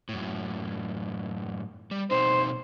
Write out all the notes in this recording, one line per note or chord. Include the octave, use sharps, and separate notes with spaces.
F#2 A2
G3
B2 C4 D#4 C5